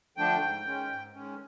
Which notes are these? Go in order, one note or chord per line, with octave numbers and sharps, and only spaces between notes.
D3 F3 A3 D4 G5
G#2
D#3 G#3 C#4
G#2
D#3 G#3 C#4